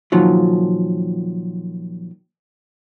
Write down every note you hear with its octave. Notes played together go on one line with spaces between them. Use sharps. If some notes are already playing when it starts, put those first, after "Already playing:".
A#2 D#3 F3 F#3